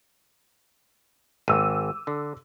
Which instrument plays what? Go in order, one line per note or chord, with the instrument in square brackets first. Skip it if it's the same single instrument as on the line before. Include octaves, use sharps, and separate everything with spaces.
[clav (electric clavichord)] G#1 [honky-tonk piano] D6 E6 D#7
[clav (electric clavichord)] D3